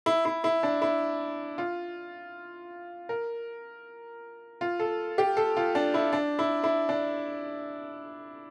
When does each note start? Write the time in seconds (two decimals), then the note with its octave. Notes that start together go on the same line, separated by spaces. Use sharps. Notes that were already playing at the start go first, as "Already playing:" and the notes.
0.06 E4
0.25 E4
0.44 E4
0.63 D4
0.82 E4
1.58 F4
3.09 A#4
4.61 F4
4.79 A4
5.18 G4
5.37 A4
5.57 F4
5.75 D4
5.94 E4
6.13 D4
6.39 E4
6.64 E4
6.89 D4